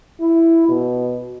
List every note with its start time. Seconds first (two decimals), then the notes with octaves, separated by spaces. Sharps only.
0.20 E4
0.69 B2